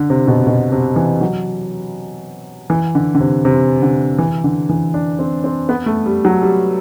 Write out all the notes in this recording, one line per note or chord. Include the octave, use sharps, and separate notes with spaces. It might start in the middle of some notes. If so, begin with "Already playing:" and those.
Already playing: D3
C3
B2
B2
C3
E3
F#3
E3
D3
D3
C3
C3
D3
E3
D3
E3
D4
C4
C4
B3
A3
G3
F#3
G3